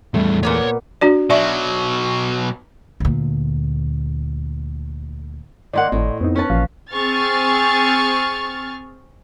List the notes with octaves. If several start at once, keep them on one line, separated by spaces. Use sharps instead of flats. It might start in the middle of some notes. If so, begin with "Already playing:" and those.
E2 A2 G3 A3
A#2 A#3 B3 C#5 C6
D4 F#4 D5
B2 F#3 D5 E5 C#6
D2 A#2
D#3 A#3 D5 D#5 F#5 C6
G#1 A2
F2 B3 C4 D#4
C#4 B4 A5
A1 A#2 F3 F5
C4 G#4 C#6 F6 A6